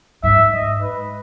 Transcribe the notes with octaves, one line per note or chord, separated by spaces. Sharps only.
G#2 E5
D#5
B4